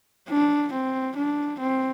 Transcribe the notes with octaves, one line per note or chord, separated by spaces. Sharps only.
D4
C4
D4
C4